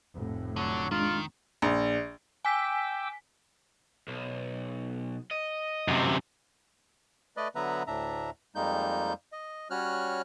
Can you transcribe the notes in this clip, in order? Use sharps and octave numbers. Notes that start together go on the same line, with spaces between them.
F1 A2
D3 F#3
D#3 G#3 D4 F4
A#1
G5 G#5 D6 E6 B6
B1
D#5
F#2 C3
A3 B4 D5 D#5
D3 F#3 B3 B4 E5 A#5
D2 A2 D4 E5 A#5
F2 G3 G#3 A#3 D#4 G6
D#5
G3 C#4 F#4 C#5 F6 F#6